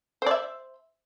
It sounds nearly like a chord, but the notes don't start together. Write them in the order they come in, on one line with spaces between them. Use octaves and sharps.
C5 D5 E5